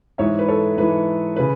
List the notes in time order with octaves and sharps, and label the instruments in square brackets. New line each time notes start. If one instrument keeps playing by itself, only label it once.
[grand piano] G#2 E3 C#5 E5
B4
A4 C#5
G#2 E3 B4
C#3 B4